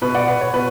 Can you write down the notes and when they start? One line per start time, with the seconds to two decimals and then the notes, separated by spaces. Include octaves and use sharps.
0.02 B2 B4
0.15 D5 F#5
0.28 B4
0.41 C#5
0.54 B2 B4